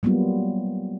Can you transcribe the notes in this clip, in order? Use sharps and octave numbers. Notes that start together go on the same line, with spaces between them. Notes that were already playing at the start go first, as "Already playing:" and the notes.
F#3 G3 A#3 B3 F4